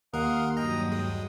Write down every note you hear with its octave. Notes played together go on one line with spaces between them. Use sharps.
D#2 A#4 F5 F#5 C6 D#6
G2 F#3 D#5 G5 A#5 D#6
G#3